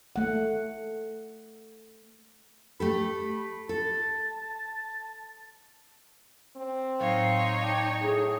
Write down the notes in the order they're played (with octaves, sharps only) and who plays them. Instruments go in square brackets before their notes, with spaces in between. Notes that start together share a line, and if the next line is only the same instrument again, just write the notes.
[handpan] A3 F#5
[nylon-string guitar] A3 G4 A4 [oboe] B5
[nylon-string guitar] A4 [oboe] A5
[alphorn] C4
[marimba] A2 F#3 [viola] D#4 C#5 [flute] F5
[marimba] D5 A5 D6 [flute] G5
[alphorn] A2 [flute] G#4